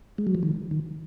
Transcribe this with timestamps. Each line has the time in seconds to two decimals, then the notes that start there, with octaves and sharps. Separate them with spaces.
0.18 G#3
0.27 F#3
0.35 F3
0.43 D#3
0.71 D#3